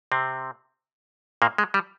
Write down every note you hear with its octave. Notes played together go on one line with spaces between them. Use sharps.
C3 C4
A#2 A#3
G#3
G3